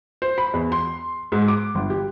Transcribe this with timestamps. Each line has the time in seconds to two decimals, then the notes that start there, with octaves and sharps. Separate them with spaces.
0.22 C5
0.38 B5
0.53 E2
0.72 C6
1.32 G#2
1.48 D6
1.75 G1
1.90 G4